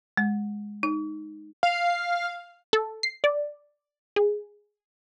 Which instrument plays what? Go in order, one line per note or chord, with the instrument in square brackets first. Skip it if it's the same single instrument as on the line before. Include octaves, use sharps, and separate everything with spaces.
[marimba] G#3
D#4
[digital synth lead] F5
[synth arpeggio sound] A4
C7
D5
G#4